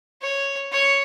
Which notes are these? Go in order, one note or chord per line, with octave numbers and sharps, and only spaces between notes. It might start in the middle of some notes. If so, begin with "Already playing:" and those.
C#5
C#5